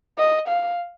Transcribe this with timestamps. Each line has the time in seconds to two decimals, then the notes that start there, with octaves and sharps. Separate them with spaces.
0.18 D#5
0.48 F5